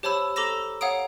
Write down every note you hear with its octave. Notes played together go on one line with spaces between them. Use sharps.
G4 C5 C#5 A5 B5 E6
A4 A#5 D6 E6 A#6 E7
C#5 F5 F#5 A#5 D#6 D7